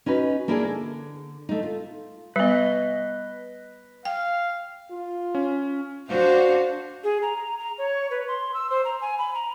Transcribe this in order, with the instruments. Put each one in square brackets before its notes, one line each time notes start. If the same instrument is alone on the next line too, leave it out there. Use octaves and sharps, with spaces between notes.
[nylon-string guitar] C#4 D#4 F#4 B4
A#3 C#4 D4 E4 F4 G#4
D3
A3 D#4
F4
[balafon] G3 B3 [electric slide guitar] B4 D#5
[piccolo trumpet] F5 [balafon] G5
[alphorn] F4
[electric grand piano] C#4
[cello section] D4 F#4 [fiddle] C5 F5
[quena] G#4
A#5
A#5
C#5
B4
C6
E6
C5
A#5
G#5
B5
A#5